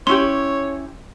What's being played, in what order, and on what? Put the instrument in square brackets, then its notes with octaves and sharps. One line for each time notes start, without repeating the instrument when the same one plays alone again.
[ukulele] C#4 E4 G4 [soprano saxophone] C#5 [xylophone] C6